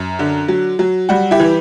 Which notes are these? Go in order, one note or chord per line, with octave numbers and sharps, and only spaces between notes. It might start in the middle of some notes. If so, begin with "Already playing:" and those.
Already playing: F#2
D3
F#3
F#3
G3 F#4
E4 G4
E3